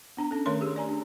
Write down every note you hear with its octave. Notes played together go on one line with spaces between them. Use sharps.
B3 D4 A#5
C#4 A4
D#3 A3 A#4 C#5 C6
G4 G#4
D5 G#5 A#5
D4